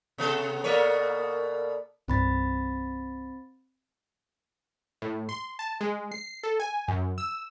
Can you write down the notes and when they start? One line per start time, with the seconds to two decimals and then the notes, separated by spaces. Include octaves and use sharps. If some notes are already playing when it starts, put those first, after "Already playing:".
0.18 C3 B3 A4
0.64 B2 A#3 A4 A#4 C#5 D5
2.08 C2 G2 C4 B5 A6
5.02 A2
5.29 C6
5.59 A5
5.81 G#3
6.12 C7
6.43 A4
6.60 G#5
6.88 F#2
7.18 E6